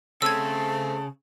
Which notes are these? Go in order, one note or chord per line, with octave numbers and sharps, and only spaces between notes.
C#3 A3 C4 A5 E6 G#6